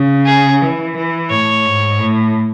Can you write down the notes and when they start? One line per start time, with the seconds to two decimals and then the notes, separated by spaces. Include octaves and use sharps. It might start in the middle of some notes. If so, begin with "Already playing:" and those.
Already playing: C#3
0.26 G#4
0.61 E3
0.96 E3
1.30 A2 C#5
1.66 G#2
2.00 A2